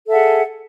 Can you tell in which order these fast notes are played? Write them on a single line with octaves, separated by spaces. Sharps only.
A4 E5 F#5 G#4